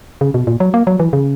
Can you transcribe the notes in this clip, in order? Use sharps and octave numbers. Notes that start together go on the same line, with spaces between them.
C#3
B2
A#2
F#3
A#3
F#3
E3
C#3